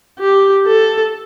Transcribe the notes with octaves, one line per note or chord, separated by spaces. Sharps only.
G4
A4